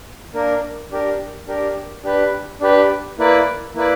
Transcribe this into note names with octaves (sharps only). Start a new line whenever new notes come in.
A#3 D4 A#4
D4 G4 A#4
D4 G4 A#4
D4 G4 B4
D4 G4 B4
A#3 E4 B4 D5
A#3 E4 B4 D5